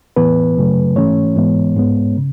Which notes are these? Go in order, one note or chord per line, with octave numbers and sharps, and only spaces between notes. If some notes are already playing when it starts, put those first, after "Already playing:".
A2 E3 B3 B4
F#2 C#3 F#3 A3
G#2 E3 A3 C#4 C#5
G#2 E3 G#3 B3
G#2 G#3 B3
C#3